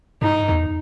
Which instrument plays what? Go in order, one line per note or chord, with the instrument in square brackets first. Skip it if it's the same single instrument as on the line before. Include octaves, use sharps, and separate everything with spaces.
[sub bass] G2 [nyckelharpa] D#4
[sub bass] E2